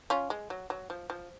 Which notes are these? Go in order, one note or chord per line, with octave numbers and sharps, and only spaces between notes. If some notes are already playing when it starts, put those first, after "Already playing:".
C#4 F4
G#3
F#3
F#3
F3
F3